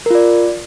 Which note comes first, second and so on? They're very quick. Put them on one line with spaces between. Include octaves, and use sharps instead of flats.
A#4 F4 D5